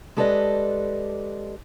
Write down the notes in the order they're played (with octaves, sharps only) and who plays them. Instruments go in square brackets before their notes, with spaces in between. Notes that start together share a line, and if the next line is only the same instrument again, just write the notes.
[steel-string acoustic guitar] G#3 G4 A4 B4 D5 D#5